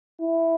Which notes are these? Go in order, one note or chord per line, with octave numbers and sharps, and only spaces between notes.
E4